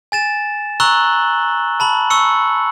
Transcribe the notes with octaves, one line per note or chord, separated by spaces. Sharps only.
G#5 A6 E7
A#5 C#6 E6 F#6 F#7 G7
A5 B5 F#7
C#6 E6 C#7